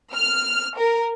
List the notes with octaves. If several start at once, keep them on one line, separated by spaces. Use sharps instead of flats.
F6
A#4